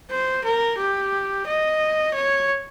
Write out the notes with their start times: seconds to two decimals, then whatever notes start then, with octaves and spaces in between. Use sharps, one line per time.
0.11 C5
0.45 A#4
0.78 G4
1.47 D#5
2.14 C#5